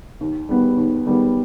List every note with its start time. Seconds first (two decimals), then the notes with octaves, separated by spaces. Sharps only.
0.21 D#2
0.49 D#3 G3 B3
0.77 D#2
1.06 D#3 G3 B3